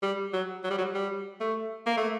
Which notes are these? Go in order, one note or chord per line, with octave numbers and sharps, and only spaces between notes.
G3
F#3
F#3
G3
F#3
G3
A3
A#3
A3